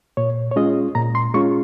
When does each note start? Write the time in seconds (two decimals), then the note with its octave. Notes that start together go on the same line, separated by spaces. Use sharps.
0.17 A#2 C#5
0.51 C#5
0.56 G#3 C#4 F4 D#5
0.95 A#2 A#5
1.15 C6
1.34 G#3 C#4 F4 C#6